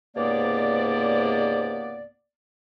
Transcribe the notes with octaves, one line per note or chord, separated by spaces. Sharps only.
C#2 G#2 C3 A#3 B3 D5